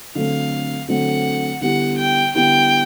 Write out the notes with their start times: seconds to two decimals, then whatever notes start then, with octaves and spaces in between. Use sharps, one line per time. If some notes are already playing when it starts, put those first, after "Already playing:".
0.15 D3 F#3 A3 C4 F5
0.88 D3 F#3 A3 C4 F#5
1.61 D3 G3 B3 E4 G4 F#5
1.98 G5
2.35 D3 G3 B3 E4 G4 G5